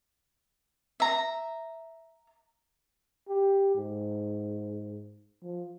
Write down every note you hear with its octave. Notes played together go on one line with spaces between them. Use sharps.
E5 A#5
G4
G#2
F3